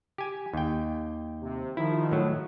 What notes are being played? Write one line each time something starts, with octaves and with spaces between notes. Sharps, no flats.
G4 G#5
D#2 G5
C3
D#3 F3 E4
A2 F#3